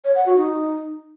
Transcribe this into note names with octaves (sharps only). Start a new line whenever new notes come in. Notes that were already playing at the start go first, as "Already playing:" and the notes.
C#5
F#5
F#4
D#4